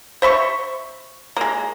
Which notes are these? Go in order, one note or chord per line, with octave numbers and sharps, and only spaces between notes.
C5 E5 C6 C#6
G#3 A#3